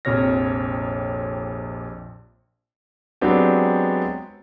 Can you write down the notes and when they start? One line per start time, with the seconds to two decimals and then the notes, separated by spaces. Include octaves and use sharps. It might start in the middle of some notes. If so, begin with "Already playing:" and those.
0.05 A#1 F2 C3 C#5 F6 A#6
3.21 F#3 G#3 B3 C4 D4 G4